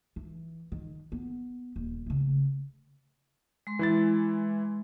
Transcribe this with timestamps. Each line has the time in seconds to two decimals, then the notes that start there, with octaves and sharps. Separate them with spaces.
0.16 E3
0.72 D#3
1.12 B3
1.76 D#1
2.06 C#3 A3
3.67 G#3 C6
3.79 E3 E4 A6